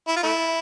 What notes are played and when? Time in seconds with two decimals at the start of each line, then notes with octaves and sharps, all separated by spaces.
0.08 E4
0.17 F4
0.23 A3 E4